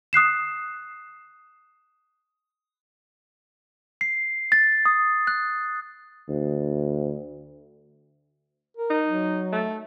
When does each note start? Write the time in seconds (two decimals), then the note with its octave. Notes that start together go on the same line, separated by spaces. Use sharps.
0.13 D#6 F#6 C7 E7
4.01 C7
4.52 A6
4.86 D#6
5.27 F#6
6.29 D2
8.77 A#4
8.90 D#4
9.05 F#3
9.53 A3